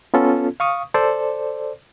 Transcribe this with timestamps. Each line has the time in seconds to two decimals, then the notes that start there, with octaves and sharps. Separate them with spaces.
0.14 B3 C#4 F4 A4
0.60 F5 C#6 D#6
0.94 A4 C5 D5